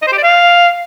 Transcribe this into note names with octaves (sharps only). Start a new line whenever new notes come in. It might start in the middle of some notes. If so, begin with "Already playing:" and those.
D#5
C5
G4
D5
F5